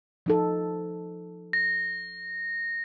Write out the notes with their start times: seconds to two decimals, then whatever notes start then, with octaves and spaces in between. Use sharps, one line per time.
0.26 F3 D#4 A4
1.53 A#6